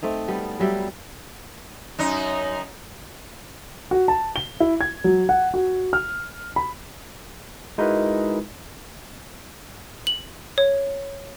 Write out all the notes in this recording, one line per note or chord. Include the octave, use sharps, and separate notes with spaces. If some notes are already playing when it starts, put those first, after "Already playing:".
A3 C4 D#4
G3 B3
F#3 G3 E5
F#2 D#4
F#4
A5
G7
E4
G#6
F#3
F#5
F#4
F6
B5
G#3 D#4 E4 F#4 A#4 B4
F#7
C#5